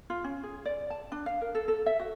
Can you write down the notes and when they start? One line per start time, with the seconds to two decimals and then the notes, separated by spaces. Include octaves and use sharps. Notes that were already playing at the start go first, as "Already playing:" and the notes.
0.10 F4
0.24 C#4
0.43 G#4
0.65 D5
0.90 A5
1.12 D4
1.26 F5
1.41 A#4
1.55 A4
1.68 A4
1.86 E5
2.00 F#4